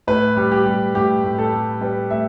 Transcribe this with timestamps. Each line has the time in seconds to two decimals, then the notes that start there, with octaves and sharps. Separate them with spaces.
0.07 A2 B4
0.37 G3
0.51 G4
0.66 G3
0.94 A2 G4
1.24 A2
1.38 A4
1.53 G3
1.81 G3 B4
2.10 A2 E5